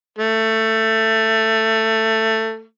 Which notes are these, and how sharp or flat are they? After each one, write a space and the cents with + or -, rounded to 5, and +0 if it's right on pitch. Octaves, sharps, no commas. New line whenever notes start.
A3 +15